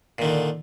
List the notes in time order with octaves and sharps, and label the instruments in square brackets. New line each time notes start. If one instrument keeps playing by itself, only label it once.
[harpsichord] A#2
D#3
D3